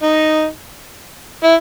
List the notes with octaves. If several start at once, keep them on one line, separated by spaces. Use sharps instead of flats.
D#4
E4